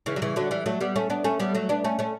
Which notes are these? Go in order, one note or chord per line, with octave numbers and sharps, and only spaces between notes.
C#3 E3
F#3
C#3 E3
D3 F#3
E3 G3
F#3 A3
G3 B3
A3 C#4
B3 D4
A3 C#4
G3 B3
F#3 A3
B3 D4
A3 C#4
A3 C#4